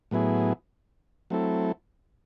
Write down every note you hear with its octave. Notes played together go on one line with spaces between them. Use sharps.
A2 F#3 B3 E4 G#4
F#3 A3 C4 E4 A4